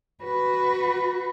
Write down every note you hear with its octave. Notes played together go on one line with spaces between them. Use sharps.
F#4 B4